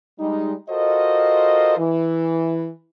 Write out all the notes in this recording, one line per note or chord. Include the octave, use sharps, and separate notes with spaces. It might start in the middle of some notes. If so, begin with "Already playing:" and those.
G3 G#3 D#4
F4 F#4 A4 A#4 C5 D#5
E3